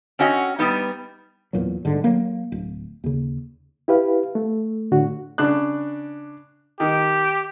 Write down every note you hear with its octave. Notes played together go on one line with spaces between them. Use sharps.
C4 C#4 F#4 D#5 F#5
G3 B3 D#4
E2 A#2 F#3
G1 G#2 D3
F#3 A#3
D1
D#2 C#3
E4 G4 B4 F5
A3
A2 D3 F#4
C#3 D4 F#6
D#3 G4